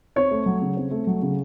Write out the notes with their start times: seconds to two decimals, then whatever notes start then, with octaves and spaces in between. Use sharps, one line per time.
0.16 C4 C#5
0.31 A3
0.46 F#3
0.61 C#3
0.77 C4
0.91 A3
1.07 F#3
1.22 C#3